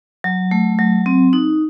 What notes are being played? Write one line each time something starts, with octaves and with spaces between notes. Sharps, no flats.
F#3
A3
F#3
C4
D#4